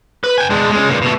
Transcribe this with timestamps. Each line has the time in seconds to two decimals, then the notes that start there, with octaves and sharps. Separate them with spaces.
0.24 B4
0.38 G5 G#5
0.50 G#3 D4
0.72 G#3 C#4
0.90 G2 A#2
1.02 B2 A3